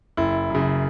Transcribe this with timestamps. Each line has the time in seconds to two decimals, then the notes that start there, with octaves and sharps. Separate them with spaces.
0.17 F#1 E4
0.50 F#2 C#3